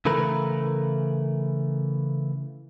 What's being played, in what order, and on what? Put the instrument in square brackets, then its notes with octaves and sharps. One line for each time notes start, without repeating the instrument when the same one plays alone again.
[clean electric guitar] C#3 E3 A3 A#4 B4